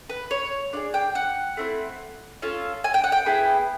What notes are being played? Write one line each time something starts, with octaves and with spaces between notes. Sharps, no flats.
B4
C#5
D4 F4 G#4 D5
G5
F#5
A3 C4 E4
C#4 F4 A4
G#5
G5
F#5
G5
B3 E4 G#4